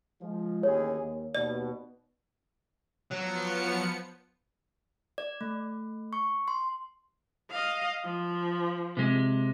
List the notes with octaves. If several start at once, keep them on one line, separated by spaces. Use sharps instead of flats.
F3 G#3
A1 D#2 G#4 C#5
D#2
D#2 B2 D5
F3 F#3 B3 C#7
D5
A3
C#6
C6
D#5 F5
F3
C3 G#3